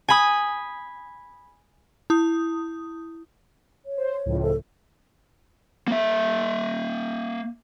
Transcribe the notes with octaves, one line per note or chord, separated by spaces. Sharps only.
G#5 B5 D#6
E4 D#6
C#5
C5
C#2 A2 F3
A4
A#3 E5